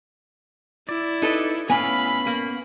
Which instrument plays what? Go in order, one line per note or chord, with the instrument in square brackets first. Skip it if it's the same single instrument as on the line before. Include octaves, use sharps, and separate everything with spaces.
[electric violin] E4 [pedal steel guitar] D5
[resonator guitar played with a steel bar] D#4 A4 B4
[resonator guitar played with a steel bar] A2 G#5 [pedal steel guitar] B3 C#4 F5 [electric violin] B5
[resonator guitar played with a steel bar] A#3